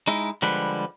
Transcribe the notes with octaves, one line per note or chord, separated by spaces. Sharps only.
G#3 D#4 E4
D3 F3 G3 G#3 B4